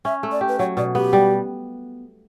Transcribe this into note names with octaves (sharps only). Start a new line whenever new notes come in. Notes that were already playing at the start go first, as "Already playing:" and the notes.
C#4 E5
A3
D5
G4
B4
F#3 C#5
B2 D5
B3 G4
G3